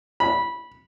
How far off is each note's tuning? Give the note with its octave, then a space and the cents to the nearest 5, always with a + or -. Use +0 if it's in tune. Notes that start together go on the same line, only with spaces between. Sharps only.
B5 -15